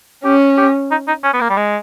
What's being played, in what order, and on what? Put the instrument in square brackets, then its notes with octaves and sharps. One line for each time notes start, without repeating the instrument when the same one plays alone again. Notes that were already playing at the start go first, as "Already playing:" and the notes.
[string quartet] C#4 [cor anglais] G4
[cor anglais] G4
D#4
D#4
C#4
B3
A#3
G3
G#3